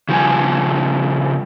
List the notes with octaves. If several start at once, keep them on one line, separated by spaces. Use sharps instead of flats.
C#3 F3 G3 G#5